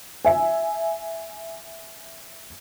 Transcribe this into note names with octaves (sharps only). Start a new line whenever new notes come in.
E5 G#5